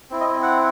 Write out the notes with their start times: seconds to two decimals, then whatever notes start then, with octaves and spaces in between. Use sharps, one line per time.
0.10 C4 E4
0.21 D#5
0.42 F#5